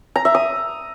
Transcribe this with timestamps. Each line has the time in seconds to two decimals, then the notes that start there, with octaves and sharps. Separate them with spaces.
0.16 A#5
0.25 E5
0.35 D#6